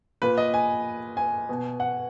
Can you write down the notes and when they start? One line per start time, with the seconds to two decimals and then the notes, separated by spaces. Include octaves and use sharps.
0.22 A#2 B4
0.38 D#5
0.54 G#5
1.17 G#5
1.49 B2
1.80 F#5